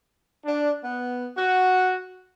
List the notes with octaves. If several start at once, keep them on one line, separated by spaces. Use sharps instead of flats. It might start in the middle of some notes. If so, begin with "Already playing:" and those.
D4
B3
F#4